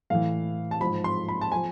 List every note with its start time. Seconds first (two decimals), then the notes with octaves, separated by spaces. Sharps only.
0.10 A2 E3 F5
0.71 A5
0.81 G#2 F3 B5
1.04 C6
1.29 B5
1.41 A5
1.52 F3 G#5